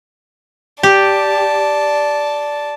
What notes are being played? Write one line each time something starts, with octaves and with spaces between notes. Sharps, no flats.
G4 D5 A5